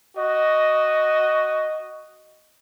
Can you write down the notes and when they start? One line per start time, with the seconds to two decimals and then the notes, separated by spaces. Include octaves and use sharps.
0.18 F#4 D#5